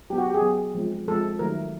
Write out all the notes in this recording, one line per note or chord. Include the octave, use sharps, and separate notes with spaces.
F#3 B3 G4
F#4
G4
G#4
F#3 B3
F3 G#3 C4
F3 G#3 C4 A4
D#3 F#3 A3 A#4